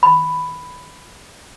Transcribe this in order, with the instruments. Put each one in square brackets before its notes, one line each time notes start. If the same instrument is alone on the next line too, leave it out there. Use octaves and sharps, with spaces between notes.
[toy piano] B5